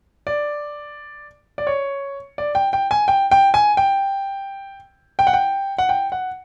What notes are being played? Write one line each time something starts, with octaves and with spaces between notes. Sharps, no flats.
D5
D5
C#5
D5
G5
G5
G#5
G5
G5
G#5
G5
G5
F#5
G5
F#5
G5
F#5